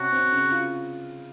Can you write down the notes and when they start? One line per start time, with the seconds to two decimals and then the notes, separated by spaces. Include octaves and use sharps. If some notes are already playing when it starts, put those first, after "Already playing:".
Already playing: C3 C#4 F#4
0.12 C4
0.32 C#3
0.51 F4